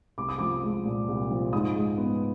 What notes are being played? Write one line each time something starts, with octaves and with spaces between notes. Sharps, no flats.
C2 D6
D#6
F3 D6
G#3
A#2
C2
F3
G#2 D#6
G#3
B3